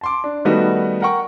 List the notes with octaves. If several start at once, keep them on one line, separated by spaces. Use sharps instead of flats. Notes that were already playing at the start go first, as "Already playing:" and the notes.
A5 C6 D6
D4
D#3 G3 A3 B3 D#4 F#4
A#4 F#5 G5 C#6